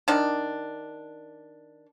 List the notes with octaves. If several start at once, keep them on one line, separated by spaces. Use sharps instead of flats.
D#3 D4